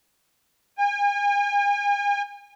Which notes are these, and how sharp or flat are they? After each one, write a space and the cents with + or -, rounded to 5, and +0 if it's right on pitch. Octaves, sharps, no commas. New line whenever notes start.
G#5 -40